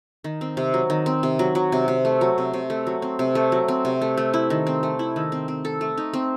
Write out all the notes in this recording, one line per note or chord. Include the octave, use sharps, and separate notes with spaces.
D#3
C4
C3
F#3
D#3
C4
C3
F#3
F#3
C3
C3
A3
F#3
C3
C3
A3
F#3
C4
C3
A3
F#3
C4
C3
A3
A3
E4
D#3
C4
A3
E4
D#3
C4
C4
A4
A3
D#4
C4